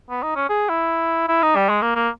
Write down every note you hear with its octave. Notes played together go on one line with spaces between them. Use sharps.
B3
D#4
C#4
G#4
E4
E4
D#4
G3
G#3
A#3
A#3